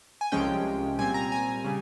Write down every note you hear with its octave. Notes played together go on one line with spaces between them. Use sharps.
G#5
C2 C3 F3 G#3 C#4 G5
A#2 G3 C4 G#5
A#5
G#5
C#3 G3